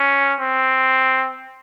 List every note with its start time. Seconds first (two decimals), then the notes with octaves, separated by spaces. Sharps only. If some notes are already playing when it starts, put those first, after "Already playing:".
Already playing: C#4
0.40 C4